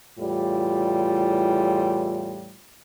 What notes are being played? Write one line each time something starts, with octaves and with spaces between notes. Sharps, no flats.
E2 A2 G3 F4